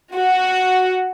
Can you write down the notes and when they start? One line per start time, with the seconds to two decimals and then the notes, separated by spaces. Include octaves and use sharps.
0.15 F#4